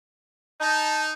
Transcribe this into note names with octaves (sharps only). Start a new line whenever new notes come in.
D#4 A5